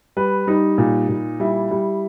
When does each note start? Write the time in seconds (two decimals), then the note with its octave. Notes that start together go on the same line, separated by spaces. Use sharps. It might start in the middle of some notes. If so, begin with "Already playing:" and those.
0.17 G3 B4
0.47 G3 D#4
0.78 A#2
1.09 A#2
1.40 G3 E4
1.71 G3